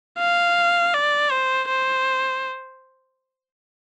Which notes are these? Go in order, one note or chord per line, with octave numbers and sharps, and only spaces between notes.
F5
D5
C5
C5